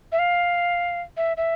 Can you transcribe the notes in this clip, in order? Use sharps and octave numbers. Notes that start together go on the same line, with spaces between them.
E5
F5
E5
E5